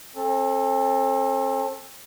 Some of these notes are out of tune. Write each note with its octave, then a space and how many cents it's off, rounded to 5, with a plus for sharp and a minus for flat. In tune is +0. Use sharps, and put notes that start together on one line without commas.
C4 +40 A4 +0